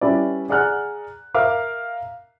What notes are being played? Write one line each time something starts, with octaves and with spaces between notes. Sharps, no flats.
G3 C#4 E4 B4 D5
G#4 D5 F#5 A#5 F6 F#6
A#4 E5 F5 D6 F6